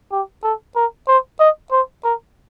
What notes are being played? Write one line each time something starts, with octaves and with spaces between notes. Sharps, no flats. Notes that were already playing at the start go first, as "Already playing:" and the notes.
G4
A4
A#4
C5
D#5
C5
A#4